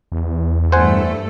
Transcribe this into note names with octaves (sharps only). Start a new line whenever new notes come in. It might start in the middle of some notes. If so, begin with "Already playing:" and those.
E2
G2 A3 A4 C5 F#5 G#5